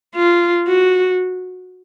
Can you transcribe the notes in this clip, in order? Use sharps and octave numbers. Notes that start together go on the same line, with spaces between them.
F4
F#4